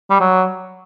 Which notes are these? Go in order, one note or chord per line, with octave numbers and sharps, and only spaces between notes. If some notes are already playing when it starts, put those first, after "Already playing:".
G3
F#3